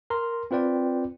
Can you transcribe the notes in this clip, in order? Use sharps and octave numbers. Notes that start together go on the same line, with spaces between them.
A#4 A#5 C6
C4 F4 B4 D5 G5